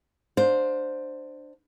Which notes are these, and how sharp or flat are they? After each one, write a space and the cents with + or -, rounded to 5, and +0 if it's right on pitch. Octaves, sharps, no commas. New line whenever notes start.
D4 +20 C5 +0 F5 +45